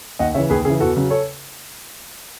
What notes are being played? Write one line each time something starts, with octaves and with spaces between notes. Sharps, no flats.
D#2 D#5 F#5
C#3 E3 C#5 E5
D#2 G#4 B4
C#3 E3 G#4
E2 F#4 A4
C#3 F#3
A4 C#5